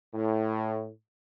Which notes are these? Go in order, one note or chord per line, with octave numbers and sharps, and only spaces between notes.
A2